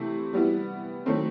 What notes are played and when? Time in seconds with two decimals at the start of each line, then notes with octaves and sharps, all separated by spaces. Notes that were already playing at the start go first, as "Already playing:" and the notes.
Already playing: C3 E3 A3 C4 E4
0.33 G3 B3 E4
1.06 D#3 F#3 A3 C4